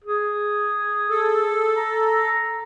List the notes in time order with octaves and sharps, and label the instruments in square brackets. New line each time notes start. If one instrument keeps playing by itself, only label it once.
[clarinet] G#4
[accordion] A4
[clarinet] A#5